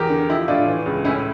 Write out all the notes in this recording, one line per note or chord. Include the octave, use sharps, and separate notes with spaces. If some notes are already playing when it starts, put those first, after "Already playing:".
Already playing: E2 G4 A#4
D3
F3 E4 G4
A2 D4 F4
E3
C#2
A2 C#4 E4